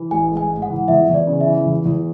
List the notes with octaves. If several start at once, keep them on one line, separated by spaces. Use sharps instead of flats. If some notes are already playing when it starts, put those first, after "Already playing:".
Already playing: E3
A1 G#5
G#3
G#5
G#2
F#5
E3
E2 E5
E2
D5
C#3
E5
E3
E2
E2